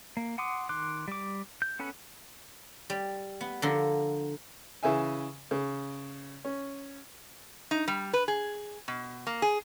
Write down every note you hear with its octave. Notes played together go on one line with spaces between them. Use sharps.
A#3
F#5 C6 D6 D#6
D#3 C6 D6 F#6
G3 D6
G6
B3 C#4 A4 F#5 B5
G3
B3
D3 F3 A4 A#4
C#3 E3 E5 G#5
C#3
C#4
D#4
G3
B4
G#4
B2
A#3
G#4